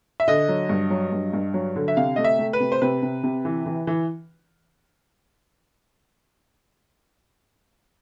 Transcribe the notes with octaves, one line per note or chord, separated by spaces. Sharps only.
E5
D3 D#5
F#3
G2
F#3
G2
G2
F#3
D3
E5
C3 F5
A3 D#5
E5
A3
B4
C3
C5
C3 B4
C3
C3
E3
E3
E3